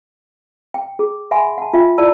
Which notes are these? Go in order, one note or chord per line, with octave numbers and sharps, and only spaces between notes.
G5
G#4
E5 F#5 G#5 B5 C6
F#5 A5
F4 E5 G5
E4 F4 D5 A5 E6